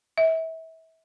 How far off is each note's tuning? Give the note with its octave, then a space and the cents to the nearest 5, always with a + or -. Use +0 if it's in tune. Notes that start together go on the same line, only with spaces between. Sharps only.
E5 -30